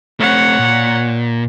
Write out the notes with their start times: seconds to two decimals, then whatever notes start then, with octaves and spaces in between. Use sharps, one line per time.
0.20 A3 C4 C#5 F#5
0.59 A#2